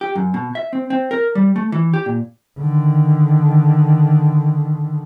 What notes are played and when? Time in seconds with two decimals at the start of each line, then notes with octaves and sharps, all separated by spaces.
0.01 G4
0.15 F#2
0.34 B2
0.55 E5
0.73 C4
0.90 C4
1.11 A#4
1.35 G3
1.56 A3
1.72 E3
1.94 G4
2.06 A#2
2.59 D3 D#3